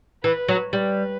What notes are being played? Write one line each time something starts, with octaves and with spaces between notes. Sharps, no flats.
E3 B4
F#3
G3 B4